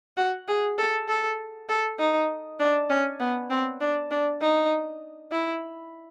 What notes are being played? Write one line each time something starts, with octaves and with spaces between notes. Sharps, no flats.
F#4
G#4
A4
A4
A4
D#4
D4
C#4
B3
C4
D4
D4
D#4
E4